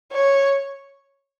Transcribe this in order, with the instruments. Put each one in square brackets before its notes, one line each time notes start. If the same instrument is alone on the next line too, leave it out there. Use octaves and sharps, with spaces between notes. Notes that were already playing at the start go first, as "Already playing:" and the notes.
[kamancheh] C#5